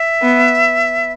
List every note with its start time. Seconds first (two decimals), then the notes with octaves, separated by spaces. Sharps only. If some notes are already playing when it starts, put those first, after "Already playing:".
Already playing: E5
0.22 B3